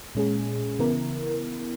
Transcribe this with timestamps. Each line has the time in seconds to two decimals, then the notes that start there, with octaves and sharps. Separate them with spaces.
0.15 A#2 G#3 C#4 G#4
0.79 C#3 E3 B3 E4 A#4